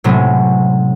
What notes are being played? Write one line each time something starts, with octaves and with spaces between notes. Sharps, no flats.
A2 C3 F#3 G#3 C4 C#4